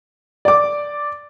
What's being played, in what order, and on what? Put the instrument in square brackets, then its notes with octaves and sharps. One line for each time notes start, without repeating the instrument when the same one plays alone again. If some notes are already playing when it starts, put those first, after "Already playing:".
[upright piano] D5 D6